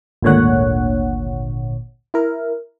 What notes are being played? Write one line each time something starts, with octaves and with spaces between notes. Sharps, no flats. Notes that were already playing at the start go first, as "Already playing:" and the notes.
G#1 D2 A#2 D3 C#5 F#5
E4 A#4